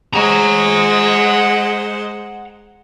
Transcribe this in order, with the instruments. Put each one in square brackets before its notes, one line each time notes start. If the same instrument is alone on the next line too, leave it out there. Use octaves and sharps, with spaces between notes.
[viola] G#3 C5 [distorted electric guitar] F#5 A#5